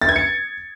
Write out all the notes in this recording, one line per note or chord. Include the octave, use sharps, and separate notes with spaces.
A6
G#6
C#7